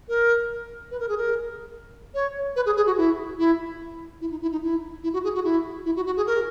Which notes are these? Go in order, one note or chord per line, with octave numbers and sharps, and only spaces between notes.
A#4
B4
A#4
G#4
A#4
C#5
B4
G#4
G#4
F#4
E4
E4
E4
D#4
E4
D#4
E4
E4
F#4
G#4
F#4
E4
E4
F#4
F#4
G#4
A#4